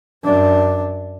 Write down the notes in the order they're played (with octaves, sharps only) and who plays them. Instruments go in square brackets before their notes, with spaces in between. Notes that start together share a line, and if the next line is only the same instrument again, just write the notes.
[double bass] F#2 D4